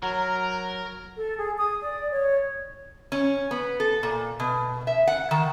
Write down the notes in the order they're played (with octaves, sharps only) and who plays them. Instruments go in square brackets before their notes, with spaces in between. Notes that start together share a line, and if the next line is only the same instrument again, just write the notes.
[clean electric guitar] F#3 [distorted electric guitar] A#4
[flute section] A4
G#4
D#6
D5
C#5
[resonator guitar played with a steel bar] C#4
B3
A4
A#2
B2
E5
F#5
D#3